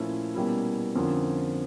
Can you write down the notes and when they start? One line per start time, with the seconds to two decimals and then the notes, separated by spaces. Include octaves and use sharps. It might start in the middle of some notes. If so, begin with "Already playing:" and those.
Already playing: A#2 F3 A3 C#4 E4
0.35 B2 G3 A#3 C#4 E4
0.95 F2 D3 F3 A#3 C#4